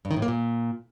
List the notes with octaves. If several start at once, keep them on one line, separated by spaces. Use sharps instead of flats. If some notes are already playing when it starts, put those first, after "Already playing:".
G2
D#3
A2
A#3
A#2